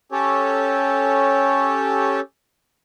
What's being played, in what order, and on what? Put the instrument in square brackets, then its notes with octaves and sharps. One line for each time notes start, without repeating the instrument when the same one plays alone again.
[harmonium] C#4 G4 A4 C#5